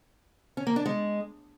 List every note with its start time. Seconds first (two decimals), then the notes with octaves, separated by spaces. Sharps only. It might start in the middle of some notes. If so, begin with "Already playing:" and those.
0.57 C#4
0.67 A#3
0.76 D4
0.86 G#3